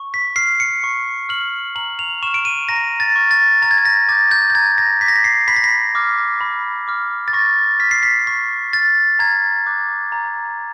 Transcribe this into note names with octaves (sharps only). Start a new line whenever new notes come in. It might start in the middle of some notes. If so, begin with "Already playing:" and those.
Already playing: C#6
B6
F6 C7
C#7
C#6
F6 F#7
A#5 F#7
F7
C#6 F6 E7
D7
D#7
A#5 A#6
A6
C#6 F6
A6
A#5 A6
G#6
A6
A#6
D6 G6 A6
G6
G6
A#5 G#6
A#6
D6 G6 B6
A#6
B6
C7
B5 B6
A#6
B6
D6 F6
B5
D6 F6
A6
C#6 A#6
F6 B6
C7
B6
C#6 B6
F6 A6
A#5 G#6
D6 F#6
A#5